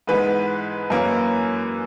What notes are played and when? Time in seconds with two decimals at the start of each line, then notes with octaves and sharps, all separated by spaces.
0.07 G#2 E3 G#3 B3 B4
0.90 F#2 E3 A#3 C#4